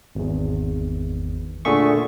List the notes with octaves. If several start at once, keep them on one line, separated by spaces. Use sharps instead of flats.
G#1 E2
A#2 D3 A3 G#4 E5 C#6